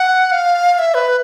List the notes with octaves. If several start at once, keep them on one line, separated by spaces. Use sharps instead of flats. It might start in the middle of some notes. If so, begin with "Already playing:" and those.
Already playing: F#5
F5
F5
E5
B4